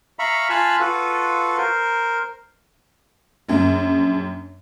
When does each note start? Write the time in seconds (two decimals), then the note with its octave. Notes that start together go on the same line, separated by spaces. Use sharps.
0.19 E5 F5 A#5 B5 C#6
0.50 F4 F5 G#5 A5 B5 F#6
0.80 F4 F#4 A4 B4
1.58 A#4 C5
3.49 A#1 F#2